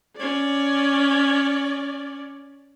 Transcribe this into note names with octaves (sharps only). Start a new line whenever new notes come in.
C#4 D5